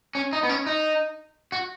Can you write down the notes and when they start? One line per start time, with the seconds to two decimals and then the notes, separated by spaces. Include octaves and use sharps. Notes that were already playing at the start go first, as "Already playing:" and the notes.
0.15 C#4
0.33 D#4
0.43 B3
0.49 C#4
0.67 D#4
1.52 F#4